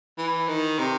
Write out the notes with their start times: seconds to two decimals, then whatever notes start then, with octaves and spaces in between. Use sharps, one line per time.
0.18 E3
0.48 D#3
0.78 C3